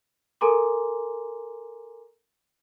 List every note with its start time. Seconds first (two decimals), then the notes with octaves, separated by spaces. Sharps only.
0.41 A4 A#4 G#5 A#5 C6 D6